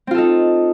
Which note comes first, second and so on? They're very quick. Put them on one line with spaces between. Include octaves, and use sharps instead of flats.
C4 F4 A4 D#4